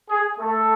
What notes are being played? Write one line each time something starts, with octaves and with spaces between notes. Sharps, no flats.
G#4
A3 A4